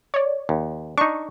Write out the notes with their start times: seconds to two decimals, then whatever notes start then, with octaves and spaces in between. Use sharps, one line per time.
0.14 C#5 D5
0.49 D#2
0.98 D4 D#4 C#6